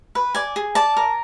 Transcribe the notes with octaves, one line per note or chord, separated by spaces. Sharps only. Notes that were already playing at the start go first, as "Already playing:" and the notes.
B4
D5 G#5
G#4
D5 A5
A#4